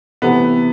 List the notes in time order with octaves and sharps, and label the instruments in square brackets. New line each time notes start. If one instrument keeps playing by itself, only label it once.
[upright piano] C3 E3 A3 [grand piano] B3